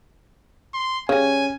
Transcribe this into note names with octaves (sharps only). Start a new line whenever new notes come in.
C6
C#3 G3 C#4 G#5